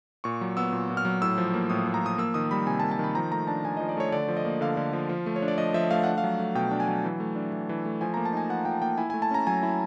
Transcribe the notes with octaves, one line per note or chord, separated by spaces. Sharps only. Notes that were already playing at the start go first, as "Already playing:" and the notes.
A#2 C#6
F#3
B3 E6
A#2
A#2
F6
F#3
A2 E6
F3
A#3
A2 D#6
A2
A#5
F3 D#6
A#3 E6
D#3 D#6
G3 B5
C3 G#5
A5
A#3
A5
D#3 B5
F3 A#5
A3 A#5
D4 A5
F3 G#5
F3 D#5
D5
A3 C#5
D3 D5
F3
D#5
A#3
D3 F5
D3
F3
F3
A3
C#5
D4
D5
F3 D#5
F3 E5
A3 F5
D4 F#5
F5
F#3
A3
B2 G5
D4
G#5
F#3
E3
A3
D4
E3
E3
A3
F3 G#5
A#3 A#5
A5
D#4 G#5
F3 F#5
F3 G5
A#3 G5
E4 G#5
A3 G#5
A5
C#4 A#5
F#3 G#5
E4